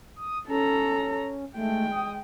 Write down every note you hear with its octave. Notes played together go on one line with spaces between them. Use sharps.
D#6
C#4 A4 A#5
G#3 A3 G5
D#6